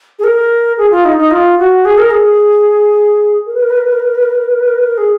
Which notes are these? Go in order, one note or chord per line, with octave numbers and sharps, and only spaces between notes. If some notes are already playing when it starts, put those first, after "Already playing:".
G#4
A#4
G#4
F4
D#4
D#4
F4
F#4
G#4
A#4
G#4
A#4
B4
A#4
B4
A#4
B4
A#4
B4
A#4
B4
A#4
B4
A#4
B4
A#4
B4
A#4
B4
A#4
G#4